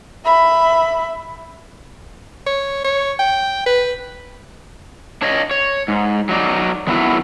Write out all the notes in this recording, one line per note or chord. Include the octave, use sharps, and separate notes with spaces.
E5 B5
C#5
C#5
G5
B4
D4 C#5 D#5
C#5
G#2
F#3 D#4 D5
D#3 F#3 B3 E4